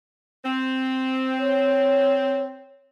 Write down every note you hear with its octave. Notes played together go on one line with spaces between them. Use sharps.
C4
C#5